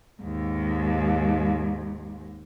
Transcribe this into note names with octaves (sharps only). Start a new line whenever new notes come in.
D#2 G#2